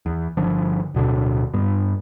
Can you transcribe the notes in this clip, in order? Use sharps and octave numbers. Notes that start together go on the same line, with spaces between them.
E2
G1 D3 F3
D1 B2 D3
G2 B3